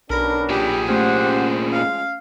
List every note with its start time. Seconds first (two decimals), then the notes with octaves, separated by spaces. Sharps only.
0.10 B1 B3 C#4 D4 A#4 B5 A#6
0.49 A#2 G4 G#4
0.88 A3 C#4 G4 C5 F#5
1.73 F3 G#3 F5